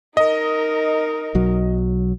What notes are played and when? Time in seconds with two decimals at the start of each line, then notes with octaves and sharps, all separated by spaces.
0.17 D#4 A#4 D#5
1.35 B1 F#3